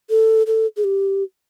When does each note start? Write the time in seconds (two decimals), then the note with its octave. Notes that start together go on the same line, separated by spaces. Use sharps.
0.10 A4
0.47 A4
0.77 G#4
0.84 G4